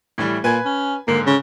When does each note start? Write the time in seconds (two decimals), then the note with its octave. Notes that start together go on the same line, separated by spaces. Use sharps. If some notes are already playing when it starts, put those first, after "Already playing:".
0.18 A2 E3 G3
0.44 A#2 B4 G#5 G#6
0.65 C#4
1.08 G#2 D3 A#3
1.26 C#3